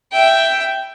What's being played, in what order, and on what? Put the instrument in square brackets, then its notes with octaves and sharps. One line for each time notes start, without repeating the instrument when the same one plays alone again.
[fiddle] E5 G5